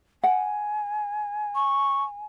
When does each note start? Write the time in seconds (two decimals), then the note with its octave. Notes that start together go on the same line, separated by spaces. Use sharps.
0.24 F#5 G#5
1.55 C#6